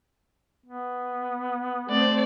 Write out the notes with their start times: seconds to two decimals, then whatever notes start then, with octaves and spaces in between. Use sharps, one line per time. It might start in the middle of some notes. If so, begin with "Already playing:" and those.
0.66 B3
1.91 A3 C4 C5 D5